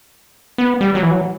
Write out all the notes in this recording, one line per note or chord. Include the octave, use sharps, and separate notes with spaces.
B3
G3
F#3
E3
F#3